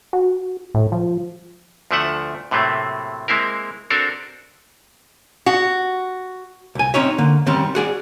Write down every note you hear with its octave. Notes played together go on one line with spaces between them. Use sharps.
F#4
A2
F3
D2 F3 A3 D4 E5 F#5
A2 C3 F#3 A3 A#3 C4
G#3 A#3 C4 E4 A#4
C4 D4 F#4 A4 A#4
F#4
C2 G#5
C4 C#4 D#4 C#5 E5
D3 A#3
D#3 G3 C4 C#4
F#4 G#4 D5